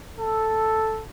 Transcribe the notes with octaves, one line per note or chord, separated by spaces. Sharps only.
A4